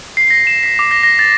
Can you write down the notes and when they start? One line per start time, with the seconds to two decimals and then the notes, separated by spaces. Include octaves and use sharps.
0.17 C7
0.30 A#6
0.47 E7
0.63 B6
0.79 D6
0.91 A#6
1.03 A#6
1.19 A6